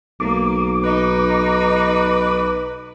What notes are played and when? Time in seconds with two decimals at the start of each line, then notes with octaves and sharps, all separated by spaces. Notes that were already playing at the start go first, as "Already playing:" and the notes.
0.20 B1 A#3 D6
0.84 D#4 B4 D#5